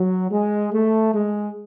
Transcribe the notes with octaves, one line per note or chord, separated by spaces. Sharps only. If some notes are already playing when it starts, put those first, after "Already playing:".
Already playing: F#3
G#3
A3
G#3